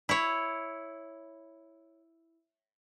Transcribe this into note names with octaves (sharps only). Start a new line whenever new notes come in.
E4 C#5